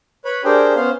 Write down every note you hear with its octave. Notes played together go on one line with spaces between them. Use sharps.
B4 C#5 B5
D4 G4 G#4 A#4 C5 G5
B3 C#4 C5 F5